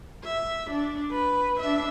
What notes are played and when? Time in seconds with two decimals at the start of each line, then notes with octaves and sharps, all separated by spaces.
0.24 E5
0.70 D4
1.11 B4
1.60 D4 E5